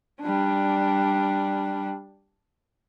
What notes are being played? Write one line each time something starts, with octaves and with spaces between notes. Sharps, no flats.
G3 D4